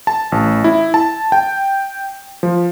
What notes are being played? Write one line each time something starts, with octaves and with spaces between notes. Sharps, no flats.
A5
A1
E4
A5
G5
F3